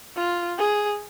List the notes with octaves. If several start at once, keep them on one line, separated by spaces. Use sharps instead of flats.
F4
G#4